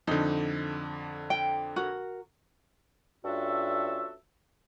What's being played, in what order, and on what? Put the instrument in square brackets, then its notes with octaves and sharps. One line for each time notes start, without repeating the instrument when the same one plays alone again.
[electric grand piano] F2 D3 [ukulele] D#4
[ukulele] G5
F#4 A#4
[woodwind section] G2 C#4 F4 F#4 A4 E5